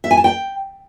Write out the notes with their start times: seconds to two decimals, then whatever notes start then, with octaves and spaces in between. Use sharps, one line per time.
0.04 E5
0.11 G#5
0.17 A5
0.24 G5